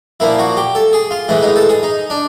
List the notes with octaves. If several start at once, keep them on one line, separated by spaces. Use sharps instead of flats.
A#2 F3 A#3 E4
F#4
G4
A4
G#4
F4
A2 E3 G#3 E4
D#4
A4
G#4
D#4
D4